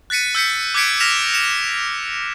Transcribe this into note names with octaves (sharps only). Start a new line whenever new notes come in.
F#6 A6 B6 C#7 D#7
E6 G6 B6 C#7
D6 F#6 G#6 B6 C#7 D7
F6 A#6 B6 E7 F7
C#7 E7